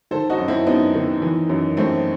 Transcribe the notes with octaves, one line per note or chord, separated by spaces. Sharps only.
D#3 A4 C5
D#4 F#4
F#2
C4 E4
F#2 B3 D#4
D#3
E3
F#2
F#2 A3 C4